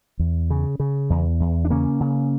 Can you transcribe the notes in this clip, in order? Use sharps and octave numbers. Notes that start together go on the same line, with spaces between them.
E2
C#3
C#3
E2
E2
D4
C#3 A#3 C#4
C#3